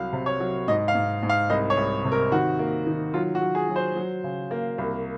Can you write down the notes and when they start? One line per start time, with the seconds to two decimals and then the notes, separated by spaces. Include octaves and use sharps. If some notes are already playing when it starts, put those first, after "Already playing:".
Already playing: C2 F#3 F5
0.13 C3
0.26 C#5
0.40 F#3
0.68 G#2 D#5
0.88 F5
0.95 G#2
1.23 G#2
1.29 F5
1.50 C2 D#5
1.70 C#5
1.77 C2
2.04 C3
2.12 A#4
2.32 D#3 F#4
2.59 A#3
2.87 D#3
3.14 F#3 F4
3.35 F#4
3.42 F#3
3.55 G#4
3.69 F#3
3.76 C5
3.96 F#3
4.24 C#3
4.51 A#3
4.78 C2